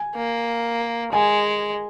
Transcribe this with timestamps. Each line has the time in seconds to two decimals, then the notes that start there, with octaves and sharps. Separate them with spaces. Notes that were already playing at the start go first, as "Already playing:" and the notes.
Already playing: G#5
0.16 A#3
1.13 G#3 G#5